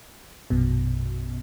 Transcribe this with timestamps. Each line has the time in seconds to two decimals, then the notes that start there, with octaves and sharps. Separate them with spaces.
0.50 A#1 F#2 B2